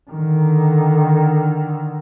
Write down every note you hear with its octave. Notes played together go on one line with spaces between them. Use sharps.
D3 D#3